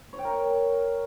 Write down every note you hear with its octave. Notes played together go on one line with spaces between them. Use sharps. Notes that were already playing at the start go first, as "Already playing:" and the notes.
C#5
G5
A#4